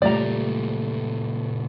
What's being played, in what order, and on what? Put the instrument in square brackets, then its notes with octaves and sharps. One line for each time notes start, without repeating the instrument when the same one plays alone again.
[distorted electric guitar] C#2 A#2 [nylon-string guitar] G3 A3 F4 [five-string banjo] D5 A#5